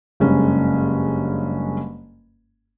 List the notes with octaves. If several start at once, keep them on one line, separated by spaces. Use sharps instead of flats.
F#1 G2 G#3 C#4